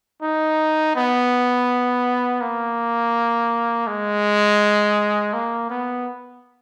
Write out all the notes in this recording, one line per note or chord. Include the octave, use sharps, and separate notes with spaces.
D#4
B3
A#3
G#3
A#3
B3